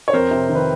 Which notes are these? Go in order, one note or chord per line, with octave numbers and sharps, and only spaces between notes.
C#5
F2 A#4 C5
C3
D#3
B4